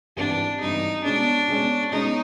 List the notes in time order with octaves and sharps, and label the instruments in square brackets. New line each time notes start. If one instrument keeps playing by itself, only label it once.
[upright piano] G#1 G2 E3 G3 [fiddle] D4
[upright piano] G#1 G2 E3 G3 [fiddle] D#4
[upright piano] B2 G#3 C#4 [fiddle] D4
[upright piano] B2 G#3 C#4
[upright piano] B2 G#3 C#4 [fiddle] D#4